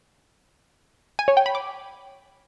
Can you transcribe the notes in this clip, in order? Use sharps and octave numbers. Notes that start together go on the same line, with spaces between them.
G#5
C#5
G5
B5
D6